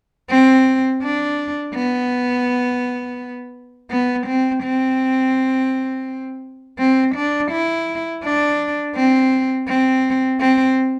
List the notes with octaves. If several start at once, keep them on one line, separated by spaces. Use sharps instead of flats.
C4
D4
B3
B3
C4
C4
C4
D4
E4
D4
C4
C4
C4